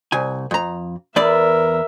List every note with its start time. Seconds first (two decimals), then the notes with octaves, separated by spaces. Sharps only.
0.12 C2 G#5
0.51 F2 A#5
1.16 E2 A#4 B4 D5 E5